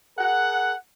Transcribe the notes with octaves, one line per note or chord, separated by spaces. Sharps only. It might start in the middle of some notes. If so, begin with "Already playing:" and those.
G#4 A#4 F#5